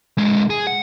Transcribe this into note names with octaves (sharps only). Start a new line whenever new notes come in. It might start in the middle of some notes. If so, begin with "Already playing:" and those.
D3 G#3
G#4
F#5